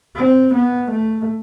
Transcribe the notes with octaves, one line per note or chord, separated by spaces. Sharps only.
C4
B3
A3